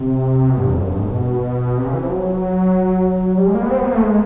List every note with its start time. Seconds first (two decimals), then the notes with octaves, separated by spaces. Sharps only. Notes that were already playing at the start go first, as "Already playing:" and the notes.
Already playing: C3
0.49 B2
0.57 G2
0.66 E2
0.73 F2
0.81 F#2
0.89 G2
0.98 G#2
1.05 B2
1.77 C3
1.86 C#3
1.93 E3
2.02 F3
2.10 F#3
3.38 G3
3.47 G#3
3.54 A#3
3.62 B3
3.70 C4
3.78 B3
3.86 A#3
3.94 A3
4.03 G#3